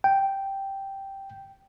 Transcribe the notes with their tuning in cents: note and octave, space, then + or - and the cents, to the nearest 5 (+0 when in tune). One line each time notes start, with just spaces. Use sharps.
G5 -5